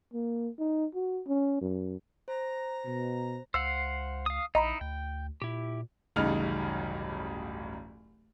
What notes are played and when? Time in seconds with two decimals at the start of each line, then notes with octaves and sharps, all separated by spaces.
0.13 A#3
0.59 D#4
0.95 F#4
1.27 C#4
1.61 F#2
2.28 C5 A#5
2.85 B2 A#5
3.54 C#2 C5 F5 F#5 E6
4.26 F5 D#6
4.55 A#1 D#4 E4 D#5 A#5 B5
4.81 D2 G5
5.42 A#2 E4 G4
6.16 D1 A1 G2 C#3 D#4 F6